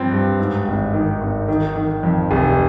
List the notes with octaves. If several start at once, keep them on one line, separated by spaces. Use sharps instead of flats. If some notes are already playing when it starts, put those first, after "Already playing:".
Already playing: G2 F3 C4
G2
G#2
G#1
D#3
G#1
D#3
D#3
F2
F1